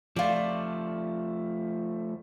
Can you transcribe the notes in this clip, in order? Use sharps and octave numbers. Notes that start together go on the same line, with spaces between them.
F3 A3 F4 D5